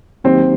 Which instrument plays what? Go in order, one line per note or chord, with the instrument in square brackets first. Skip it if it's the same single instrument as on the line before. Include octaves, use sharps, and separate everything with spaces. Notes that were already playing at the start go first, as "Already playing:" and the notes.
[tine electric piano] D#3 F#3 A#3 D#4 G4 [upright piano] C4